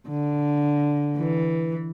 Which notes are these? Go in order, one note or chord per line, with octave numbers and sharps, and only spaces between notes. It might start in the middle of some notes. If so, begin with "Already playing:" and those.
D3
E3